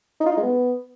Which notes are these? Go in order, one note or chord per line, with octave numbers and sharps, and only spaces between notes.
D#4
F4
D#4
G#3
B3